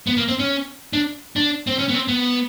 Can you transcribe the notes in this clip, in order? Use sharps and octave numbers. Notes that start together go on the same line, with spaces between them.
B3
A#3
C4
C#4
D4
D4
C4
C#4
B3
C4
B3